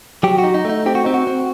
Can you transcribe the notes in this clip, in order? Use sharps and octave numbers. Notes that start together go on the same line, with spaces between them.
F#3 G4
F#4
D#4
D#4
A3 D#4
C4 G4
F#4
C4 D#4
F#4
C4